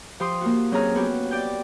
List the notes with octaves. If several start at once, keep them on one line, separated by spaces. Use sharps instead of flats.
F3 G4 C6 D#6
A#3 F4 F#4
F#3 C4 C#4 G#4 A#5 F6
B3 F#4 G4
D5 G5 G6